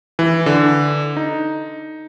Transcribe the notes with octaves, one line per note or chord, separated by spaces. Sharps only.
E3
D3
D#4